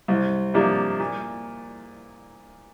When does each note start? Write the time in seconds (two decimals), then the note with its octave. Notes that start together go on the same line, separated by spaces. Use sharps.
0.08 C2
0.54 C3 F3 A#3 D4
1.00 A#2